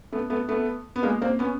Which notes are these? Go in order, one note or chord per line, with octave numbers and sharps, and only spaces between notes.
A3 B3
A3 B3
A3 B3
B3
G#3 A#3
A#3 C4
B3 C#4